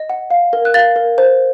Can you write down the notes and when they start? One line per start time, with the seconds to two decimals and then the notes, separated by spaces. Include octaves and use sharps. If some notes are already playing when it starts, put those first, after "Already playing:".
Already playing: D#5
0.10 F#5
0.30 F5
0.53 A#4
0.65 F#6
0.74 F5 A6
0.96 A#4
1.18 C5